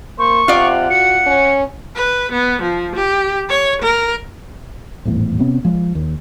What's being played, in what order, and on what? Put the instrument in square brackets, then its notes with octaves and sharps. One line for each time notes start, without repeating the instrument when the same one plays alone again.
[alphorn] A#3 [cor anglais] C5 [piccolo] C#6
[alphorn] C3 [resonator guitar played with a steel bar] F4 D5 [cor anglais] F#5
[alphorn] F#4 [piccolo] C#7
[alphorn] C#4
[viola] B4
B3
F3
G4
C#5
A#4
[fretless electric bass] D#1 G#1 E2 A2
C3 B3 C#4
F3 G#3
D#2